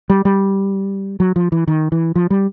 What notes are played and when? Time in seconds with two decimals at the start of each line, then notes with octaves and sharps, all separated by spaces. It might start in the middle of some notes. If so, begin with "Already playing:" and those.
0.10 G3
0.25 G3
1.20 F#3
1.36 F3
1.52 E3
1.67 D#3
1.92 E3
2.16 F3
2.30 G3